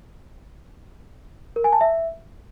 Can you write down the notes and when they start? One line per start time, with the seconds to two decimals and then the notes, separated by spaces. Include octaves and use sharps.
1.56 A#4
1.64 G#5
1.73 A5
1.81 E5